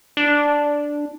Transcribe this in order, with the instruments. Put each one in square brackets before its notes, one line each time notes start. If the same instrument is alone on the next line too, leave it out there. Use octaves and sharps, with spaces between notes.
[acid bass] D4